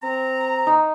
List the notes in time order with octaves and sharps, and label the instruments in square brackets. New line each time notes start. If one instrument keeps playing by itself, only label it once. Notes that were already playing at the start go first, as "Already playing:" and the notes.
[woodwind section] C4 A#5
[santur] D#4